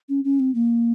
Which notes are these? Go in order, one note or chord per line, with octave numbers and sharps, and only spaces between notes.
C#4
C#4
C4
A#3